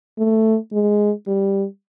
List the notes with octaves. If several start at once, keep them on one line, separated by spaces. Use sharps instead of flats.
A3
G#3
G3